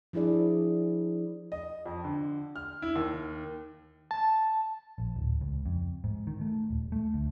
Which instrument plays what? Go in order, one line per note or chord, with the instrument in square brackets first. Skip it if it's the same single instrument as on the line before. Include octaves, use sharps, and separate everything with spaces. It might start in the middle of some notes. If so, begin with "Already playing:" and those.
[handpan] F3 D4 E4 G#4 D5
[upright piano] D#5
F2
D3
F6
E4
D#2
[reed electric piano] A5
[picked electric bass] A#1
D1
C#2
F2
G#2
D#3
A3
D#1
A3
D2